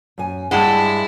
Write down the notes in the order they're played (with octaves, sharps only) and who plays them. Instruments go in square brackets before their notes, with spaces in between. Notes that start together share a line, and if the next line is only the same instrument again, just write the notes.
[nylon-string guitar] F#2 G#5
[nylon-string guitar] G2 [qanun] G#3 C6 [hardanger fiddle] E4 [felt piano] F#5 G5 A5